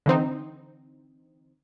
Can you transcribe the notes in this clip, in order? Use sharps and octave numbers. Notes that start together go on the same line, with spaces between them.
D3 E3 C4 D#4